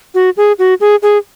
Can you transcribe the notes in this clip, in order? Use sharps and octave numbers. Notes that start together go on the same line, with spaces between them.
F#4
G#4
F#4
G#4
G#4